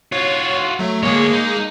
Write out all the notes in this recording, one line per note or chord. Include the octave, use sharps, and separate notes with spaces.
F4 F#4 C#5
F#3 A3
D2 G#3 A#3 G#4 C#5
D#4